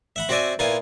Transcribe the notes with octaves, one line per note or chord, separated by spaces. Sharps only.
E5 F#5 B5
C4 F#4 C5 D5 E5 G#5
A#2 B3 E4 F4 G#5